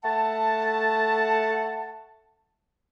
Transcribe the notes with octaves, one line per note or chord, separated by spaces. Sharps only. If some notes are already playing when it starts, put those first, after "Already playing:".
A3 F#5 A5